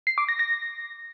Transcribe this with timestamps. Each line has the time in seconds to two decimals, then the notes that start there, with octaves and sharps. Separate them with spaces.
0.07 C7
0.18 D6
0.28 A#6
0.39 A#6